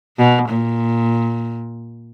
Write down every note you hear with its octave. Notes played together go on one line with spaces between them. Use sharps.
B2
A#2